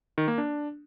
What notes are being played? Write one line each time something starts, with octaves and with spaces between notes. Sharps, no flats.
D#3
A#3
D4